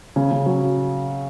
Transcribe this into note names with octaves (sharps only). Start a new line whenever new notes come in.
C#3
C#3
F#3